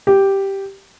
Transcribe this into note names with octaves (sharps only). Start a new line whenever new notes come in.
G4